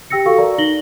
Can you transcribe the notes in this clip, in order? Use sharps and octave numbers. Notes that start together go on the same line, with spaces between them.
G4 G5 E6 A#6 C#7
F#4 A4 F5 C#6
A#4 D5 A#5
D#4 A#6 F#7 G7